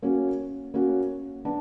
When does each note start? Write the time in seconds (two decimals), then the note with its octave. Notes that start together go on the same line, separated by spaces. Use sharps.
0.02 A#3 C#4 F#4
0.74 A#3 C#4 F#4
1.45 B3 D4